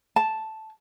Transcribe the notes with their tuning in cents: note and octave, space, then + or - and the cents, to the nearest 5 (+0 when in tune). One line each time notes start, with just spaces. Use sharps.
A5 -5